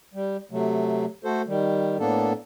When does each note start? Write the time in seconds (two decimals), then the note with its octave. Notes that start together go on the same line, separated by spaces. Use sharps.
0.14 G3
0.51 C3 F#3 A3
1.24 A3 F#4 A4 C5
1.47 D#3 G3
1.99 A2 A#3 B3 D4 A4